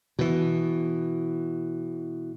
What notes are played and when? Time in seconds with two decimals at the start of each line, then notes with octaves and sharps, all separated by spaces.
0.19 B2 E3